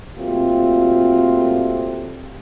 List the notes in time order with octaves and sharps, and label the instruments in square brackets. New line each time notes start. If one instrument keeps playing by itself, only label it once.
[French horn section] A#2 F#3 A3 C4 F4 G4